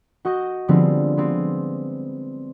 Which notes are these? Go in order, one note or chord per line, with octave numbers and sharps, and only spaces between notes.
F#4 D#5 C#6 G6 A#6
D3 F3 G3 G#3 B3 C4
G#3 B3 C4